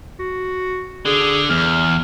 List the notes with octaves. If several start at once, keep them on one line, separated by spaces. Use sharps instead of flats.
F#4
D3 G#4
E2 F6